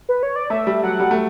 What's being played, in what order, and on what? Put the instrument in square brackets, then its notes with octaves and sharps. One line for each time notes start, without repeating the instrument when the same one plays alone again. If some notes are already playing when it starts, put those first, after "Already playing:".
[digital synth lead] B4
C#5
D5
[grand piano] A3 [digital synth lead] E5
[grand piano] G3
[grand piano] F#3 [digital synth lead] F#5
[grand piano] G3
A3